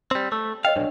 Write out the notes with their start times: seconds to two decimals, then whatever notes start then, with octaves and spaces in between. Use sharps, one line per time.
0.11 G3 C4
0.32 A3 E6
0.65 C#5 D#5 F5 G5
0.76 B1 G2 D4 C#5 D5